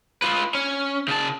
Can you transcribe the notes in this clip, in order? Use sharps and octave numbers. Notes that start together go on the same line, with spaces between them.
F4 B4
C#4
C#3 A5